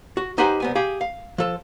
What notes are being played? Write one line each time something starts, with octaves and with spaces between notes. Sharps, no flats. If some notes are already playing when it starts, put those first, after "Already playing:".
F#4
D#4 G4 B4 C5 F#5 G#5
C2 B3 G#5
G4 G#4 F5
F5
F3 A4